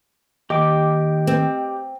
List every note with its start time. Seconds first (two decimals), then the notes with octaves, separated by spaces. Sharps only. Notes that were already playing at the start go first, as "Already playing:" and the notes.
0.50 D#2 G4 D#5 G5 D6
1.27 C4